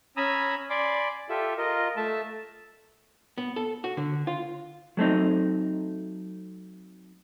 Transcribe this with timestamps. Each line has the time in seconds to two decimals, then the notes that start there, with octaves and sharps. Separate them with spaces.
0.17 C#4 G#5 A#5 B5 D#6 E6
0.70 D5 G#5 B5 C6 D6
1.30 F4 G4 A4 E5
1.58 F4 A#4 D#5
1.97 A3 E5 A5
3.38 B3
3.56 A4
3.84 F#4
3.97 D3
4.27 F4
4.97 F#3 A3 C4 D#4